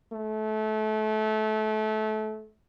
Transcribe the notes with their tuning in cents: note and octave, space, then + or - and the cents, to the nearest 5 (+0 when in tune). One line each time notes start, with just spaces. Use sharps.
A3 -25